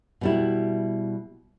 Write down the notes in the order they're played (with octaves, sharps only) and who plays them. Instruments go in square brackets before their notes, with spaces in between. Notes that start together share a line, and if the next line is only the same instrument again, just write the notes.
[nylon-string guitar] B2 G3 E4